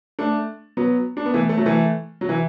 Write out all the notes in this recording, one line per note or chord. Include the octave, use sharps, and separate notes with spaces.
A3 D4
F#3 B3
D4
B3
E3 A3
A3
F#3
E3 A3
F#3
E3